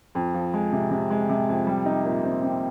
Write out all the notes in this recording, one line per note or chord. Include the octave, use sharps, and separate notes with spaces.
F2
F3
G#3
C3
C3
G#3
C3
F2
G3
D#4
A#2
C4
C4